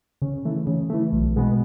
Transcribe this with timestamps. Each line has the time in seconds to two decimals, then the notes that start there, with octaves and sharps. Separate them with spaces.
0.22 C#3
0.45 E3 A3
0.67 C#3
0.90 E3 A3
1.12 B1
1.36 B2 G#3 B3